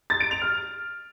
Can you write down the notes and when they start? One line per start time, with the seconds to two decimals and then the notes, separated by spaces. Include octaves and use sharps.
0.10 A6
0.21 D7
0.31 F7
0.42 F6